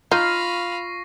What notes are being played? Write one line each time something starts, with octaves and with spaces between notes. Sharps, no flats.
D#4 F4 F5 B5 C#6 A#6 C7